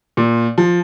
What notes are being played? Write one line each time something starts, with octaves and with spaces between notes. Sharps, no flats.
A#2
F3